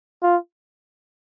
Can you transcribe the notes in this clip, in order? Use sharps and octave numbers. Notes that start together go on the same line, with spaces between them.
F4